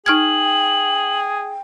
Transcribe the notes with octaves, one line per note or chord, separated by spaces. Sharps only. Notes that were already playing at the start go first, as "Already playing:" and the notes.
D#4 G#4 G5 F6 G#6 F#7